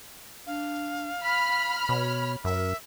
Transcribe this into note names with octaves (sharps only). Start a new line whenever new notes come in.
D4 F5
B5 F6 B6
B2 C#5
F#2 A#4 E5